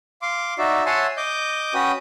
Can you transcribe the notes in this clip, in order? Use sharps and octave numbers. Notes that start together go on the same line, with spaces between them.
F5 C6 D6
D#4 F#4 D5 E5
C#5 E5 F#5 G#5 A5 C6
D#5 D6 G6
C#4 F#4 B4 G5 D#6